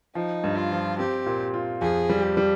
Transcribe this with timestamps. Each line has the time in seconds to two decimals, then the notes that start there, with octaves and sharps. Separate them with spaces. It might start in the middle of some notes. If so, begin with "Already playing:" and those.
0.15 F3 D#4
0.44 G2
0.57 F4
0.72 F3
0.99 C4 G4
1.26 A#2
1.54 F4
1.81 F2 G#4
2.10 G3
2.23 G4
2.37 G3